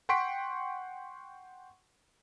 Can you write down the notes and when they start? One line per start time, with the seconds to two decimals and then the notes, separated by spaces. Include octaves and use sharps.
0.09 F#5 G5 C6 C#6 B6 D7